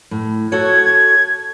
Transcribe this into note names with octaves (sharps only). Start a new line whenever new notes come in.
A2
F#4 A4 C#5 G#6